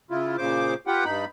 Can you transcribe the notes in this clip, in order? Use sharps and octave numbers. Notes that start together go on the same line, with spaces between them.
C#3 E4 F4
A#2 C#3 C5 D6
F4 G4 B4 F#5 G5
G2 D#4 B5